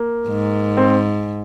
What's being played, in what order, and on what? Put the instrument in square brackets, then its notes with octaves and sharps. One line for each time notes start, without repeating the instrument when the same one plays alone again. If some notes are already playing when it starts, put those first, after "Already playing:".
Already playing: [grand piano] A#3
[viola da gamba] G#2
[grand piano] C4